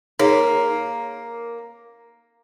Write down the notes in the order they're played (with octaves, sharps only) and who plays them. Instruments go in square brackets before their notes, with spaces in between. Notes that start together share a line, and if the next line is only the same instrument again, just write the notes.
[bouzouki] A#3 [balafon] D#4 G#4 C#5